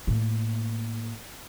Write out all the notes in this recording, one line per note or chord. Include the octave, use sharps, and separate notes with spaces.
A2 A#3